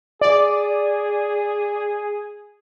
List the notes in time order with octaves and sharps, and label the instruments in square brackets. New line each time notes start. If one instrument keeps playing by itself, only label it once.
[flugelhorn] G#4 [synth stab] D5